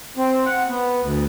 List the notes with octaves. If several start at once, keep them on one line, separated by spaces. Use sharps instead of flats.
C4
F#5
B3
D2